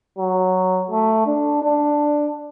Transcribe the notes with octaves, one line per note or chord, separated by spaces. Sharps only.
F#3
A3
D4
D4